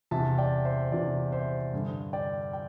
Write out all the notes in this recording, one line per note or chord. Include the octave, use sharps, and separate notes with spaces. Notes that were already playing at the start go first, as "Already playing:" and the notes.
E2 C3 E3 E5 A5
D5 G5
C5 E5
E2 C3 E3 D5
C5 E5
G2 D3
D5 G5
G5